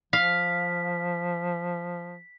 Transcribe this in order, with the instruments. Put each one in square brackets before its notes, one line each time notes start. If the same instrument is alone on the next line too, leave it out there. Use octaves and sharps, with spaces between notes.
[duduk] F3 [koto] F5 [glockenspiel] B6